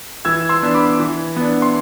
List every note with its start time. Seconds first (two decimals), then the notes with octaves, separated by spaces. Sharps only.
0.25 E3 E6 G#6
0.49 C6 E6
0.63 B3 D4
0.74 B5 D6
1.00 E3
1.36 B3 D4
1.62 C6